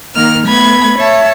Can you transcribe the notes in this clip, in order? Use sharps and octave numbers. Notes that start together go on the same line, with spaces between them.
D#3 A#3 F6
A3 B3 B5 G#6
C#5 E5 A5